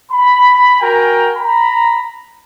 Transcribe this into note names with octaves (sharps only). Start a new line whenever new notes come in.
B5
F#4 A#4 G5 G#5 A#5
A#5 B5